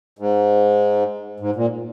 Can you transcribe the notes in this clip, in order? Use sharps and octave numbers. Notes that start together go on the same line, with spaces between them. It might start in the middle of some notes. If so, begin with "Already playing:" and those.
G#2
G#2
A#2